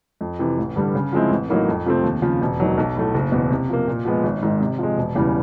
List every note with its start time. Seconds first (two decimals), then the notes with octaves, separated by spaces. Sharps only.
0.21 F2
0.39 C3 E3
0.58 A1
0.76 G2 D3 G3
0.95 C#3
1.13 F3 G#3 C4 E4
1.31 A1
1.50 A2 F#3 A#3 D#4
1.68 F2
1.85 C3 F3 A3 C4
2.04 D#2
2.22 C#3 F3
2.41 E1
2.60 D#2 D#3 F#3
2.77 B1
2.96 A2 F#3 A3
3.14 F#1
3.32 E2 B2
3.50 C3
3.70 F3 A#3
3.88 A#2
4.05 F3 G#3 B3
4.23 G#1
4.43 G#2 D#3
4.60 C3
4.79 F3 G#3
4.97 E1
5.15 E2 C#3 E3 G3